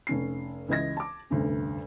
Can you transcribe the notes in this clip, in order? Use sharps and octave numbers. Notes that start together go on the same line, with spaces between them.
F1 C#4 C7
C#2 E3 D#5 G#6 A#6
A5 D6
F1 D2 G2 C#4